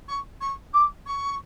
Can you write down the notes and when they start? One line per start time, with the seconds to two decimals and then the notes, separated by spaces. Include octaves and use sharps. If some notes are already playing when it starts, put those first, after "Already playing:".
0.09 C#6
0.41 C#6
0.73 D6
1.06 C#6